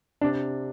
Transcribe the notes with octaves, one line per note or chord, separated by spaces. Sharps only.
C3 D4